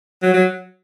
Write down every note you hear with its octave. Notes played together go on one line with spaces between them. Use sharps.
F#3
F#3